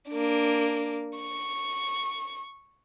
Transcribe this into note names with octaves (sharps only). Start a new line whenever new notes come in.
A#3 D4
C#6